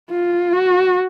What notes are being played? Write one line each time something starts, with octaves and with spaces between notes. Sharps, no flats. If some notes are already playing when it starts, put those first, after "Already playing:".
F4
F#4